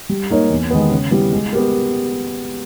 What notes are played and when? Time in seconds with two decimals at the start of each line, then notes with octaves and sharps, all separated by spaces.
0.09 G3
0.30 A#3 D#4 A#4 C#5
0.50 E2
0.71 D#3 G#3 B3
0.91 C#3
1.11 G3 B3 E4
1.32 G#3
1.53 B3 G4 A#4